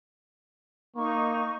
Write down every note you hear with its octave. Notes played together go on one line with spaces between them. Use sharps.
A#3 D#4 C#6